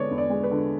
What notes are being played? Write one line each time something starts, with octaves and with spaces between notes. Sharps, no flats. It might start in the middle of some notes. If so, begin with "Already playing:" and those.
Already playing: D3 G#3 B3 C#5 D5
E2
D5
G#3
B4
D3